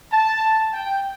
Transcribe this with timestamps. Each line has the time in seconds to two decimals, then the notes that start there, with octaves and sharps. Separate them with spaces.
0.12 A5
0.73 G5